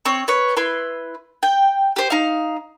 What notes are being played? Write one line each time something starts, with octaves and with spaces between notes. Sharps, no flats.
C4 C#5
B4 C#5
E4 B4 C6
G5
G4 C5
D#4 F5